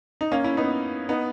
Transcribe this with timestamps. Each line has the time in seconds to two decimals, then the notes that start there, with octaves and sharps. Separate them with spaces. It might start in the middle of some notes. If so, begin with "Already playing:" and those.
0.21 D#4
0.32 A#3 C#4
0.44 C#4 E4
0.57 B3 D#4
1.09 B3 D#4